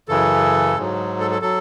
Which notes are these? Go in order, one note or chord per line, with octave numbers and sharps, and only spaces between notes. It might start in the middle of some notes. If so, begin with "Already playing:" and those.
F#2 C#3 E3 A4
G#2 F#3
A4
A4
F#3 A4